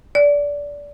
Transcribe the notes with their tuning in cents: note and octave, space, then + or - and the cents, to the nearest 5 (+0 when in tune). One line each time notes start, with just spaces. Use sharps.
D5 -20